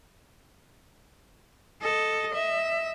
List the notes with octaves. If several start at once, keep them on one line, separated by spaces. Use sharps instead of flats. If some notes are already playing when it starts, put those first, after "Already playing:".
A4 D#5
E5